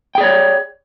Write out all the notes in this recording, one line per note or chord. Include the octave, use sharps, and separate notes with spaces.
G#4 C#5 D5 G5